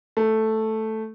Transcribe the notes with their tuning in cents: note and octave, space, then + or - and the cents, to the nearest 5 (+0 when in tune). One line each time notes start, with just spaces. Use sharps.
A3 +0